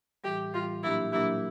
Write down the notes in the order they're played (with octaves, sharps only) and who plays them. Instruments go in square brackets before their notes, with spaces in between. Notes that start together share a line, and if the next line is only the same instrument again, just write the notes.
[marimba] A2 E3 G3 [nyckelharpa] G4
[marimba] A2 E3 G3 [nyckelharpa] F4
[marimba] A#2 F#3 A#3 D4 G4 [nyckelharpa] E4
[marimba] A#2 F#3 A#3 D4 G4 [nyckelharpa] E4